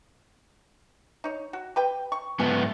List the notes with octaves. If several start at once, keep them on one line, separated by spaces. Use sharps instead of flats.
D#4 C#5
F#4
G4 B4 G5
C#6
G#2 A3 B3 G#5